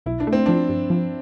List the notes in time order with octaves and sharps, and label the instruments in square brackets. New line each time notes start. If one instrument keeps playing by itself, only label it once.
[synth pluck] B1 [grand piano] E4
[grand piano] D4
[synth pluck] A3
[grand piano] C4
[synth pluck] F3 [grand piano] D4
[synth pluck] G2
F3